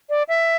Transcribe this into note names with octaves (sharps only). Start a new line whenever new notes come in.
D5
E5